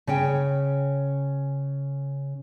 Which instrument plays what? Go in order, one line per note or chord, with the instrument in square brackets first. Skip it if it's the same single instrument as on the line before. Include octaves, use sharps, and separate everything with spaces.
[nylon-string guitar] C#3 C#4 G5